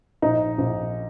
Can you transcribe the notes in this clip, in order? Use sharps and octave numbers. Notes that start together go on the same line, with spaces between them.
A#1 D#4
A#1